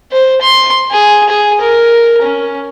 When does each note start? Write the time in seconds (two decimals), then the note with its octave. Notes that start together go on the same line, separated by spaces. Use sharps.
0.12 C5
0.41 C6
0.91 G#4
1.29 G#4
1.61 A#4
2.22 C#4